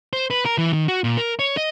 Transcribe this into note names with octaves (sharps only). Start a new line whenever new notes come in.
C5
B4
A#4
E3
D#3
F#4
A#2
A#4
C#5
D#5